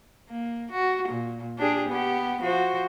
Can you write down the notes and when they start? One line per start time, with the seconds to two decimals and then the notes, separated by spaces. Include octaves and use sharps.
0.29 A#3
0.71 F#4
1.08 A#2
1.58 D4 G4 G#4
1.88 B3 G4
2.42 F3 F#4 C5